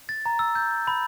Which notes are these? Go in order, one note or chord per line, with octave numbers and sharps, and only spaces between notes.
A6
A#5
E6
G6
B5